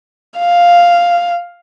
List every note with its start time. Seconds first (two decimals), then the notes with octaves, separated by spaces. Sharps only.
0.39 F5